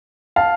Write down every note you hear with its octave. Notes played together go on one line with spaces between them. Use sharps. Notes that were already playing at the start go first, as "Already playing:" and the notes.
F5 A5